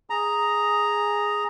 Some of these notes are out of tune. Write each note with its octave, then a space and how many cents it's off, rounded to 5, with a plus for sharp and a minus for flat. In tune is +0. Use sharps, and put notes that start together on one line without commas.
G#4 +0 A#5 +0